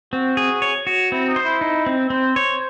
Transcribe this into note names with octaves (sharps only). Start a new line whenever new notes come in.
C4 F#4
G#4
C#5
F#4
C4 E4
D#4
C5
E4
D#4
C4
C4 C5
C#5